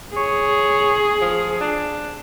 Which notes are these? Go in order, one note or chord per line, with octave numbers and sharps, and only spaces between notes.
G#4 C#5
F3
D4